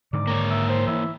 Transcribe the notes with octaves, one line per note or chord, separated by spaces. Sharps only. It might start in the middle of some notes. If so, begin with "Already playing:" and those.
G#2 D3 D#3 D5
A#3 C#5
E5
C5
E3 E5